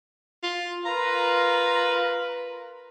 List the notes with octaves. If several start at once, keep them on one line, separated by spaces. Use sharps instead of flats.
F4
F4 A#4 B4 A#5